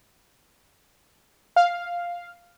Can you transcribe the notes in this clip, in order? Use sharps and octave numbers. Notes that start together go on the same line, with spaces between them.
F5